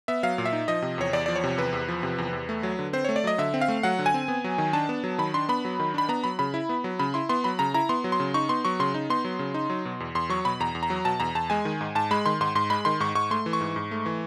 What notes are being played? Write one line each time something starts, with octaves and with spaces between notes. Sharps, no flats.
B3 E5
F#3 F5
A#2
E5
D#4
F3 D#5
C3
E2 C#5
E2 D5
F3 D5
C#5
C3
E2 B4
E2
F3
C3
E2
E2
A3
F#3
D3
C4 C5
A3 C#5
D5
F#3 D#5
D3 E5
C4
F5
A3
F#3 F#5
D3
G#5
C4
B3
F#3
D#3
D4 A5
B3
F#3
D#3 B5
D4 C6
B3 B5
F#3
D#3
D4 B5
B3 A#5
F#3 B5
C#3 B5
E4
B3
F#3
C#3 B5
E4 C6
B3 C6
F#3 B5
C#3 A#5
E4 A#5
B3 C6
F#3
C6
C#3
D#4 C#6
B3 C6
F#3 C#6
C#3 C6
D#4
B3 C6
F#3
C#3
D#4
F#3
B2
E2
E2 C6
F#3 C#6
B2 B5
E2 A#5
E2
A#5
F#3
B2 A5
E2 A#5
E2 A5
G#3 G#5
D#3
G#2
G#2 A5
G#3 B5
D#3 C6
G#2 C6
G#2 C6
G#3 B5
D#3 C6
G#2 C#6
G#2 C#6
A3 C6
E3
C#6
G#2
G#2
A3
E3